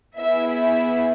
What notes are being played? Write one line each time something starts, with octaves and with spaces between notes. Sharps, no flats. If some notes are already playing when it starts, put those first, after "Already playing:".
B3 E4 G#4 E5
E5